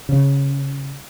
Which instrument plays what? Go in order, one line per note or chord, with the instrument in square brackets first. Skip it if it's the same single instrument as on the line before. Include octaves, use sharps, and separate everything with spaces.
[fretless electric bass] C#3